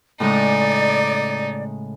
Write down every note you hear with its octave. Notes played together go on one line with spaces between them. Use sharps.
A2 C#3 G#3 D#4 D5